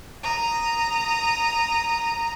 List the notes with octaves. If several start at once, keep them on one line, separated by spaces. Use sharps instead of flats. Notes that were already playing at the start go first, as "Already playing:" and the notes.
A#5 D#6